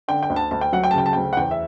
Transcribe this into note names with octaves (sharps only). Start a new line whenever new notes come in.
D3 G5
G5
D2
A5
D2 A5
G5
F#3 F#5
G5
A5
C#3 G5
A5
D2 G5
F#5
E2 G5
E5